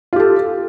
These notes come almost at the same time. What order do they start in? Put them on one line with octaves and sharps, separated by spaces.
F4 G4 A4